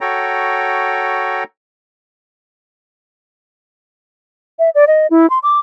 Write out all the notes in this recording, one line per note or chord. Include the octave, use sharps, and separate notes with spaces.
F#4 A4 C#5 G5 A#5
E5
D5
D#5
E4
C6
D6